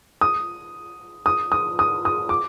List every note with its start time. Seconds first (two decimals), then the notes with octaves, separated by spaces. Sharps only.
0.21 D#6
1.26 D#6
1.52 D#6
1.79 D#6
2.05 D#6
2.29 D6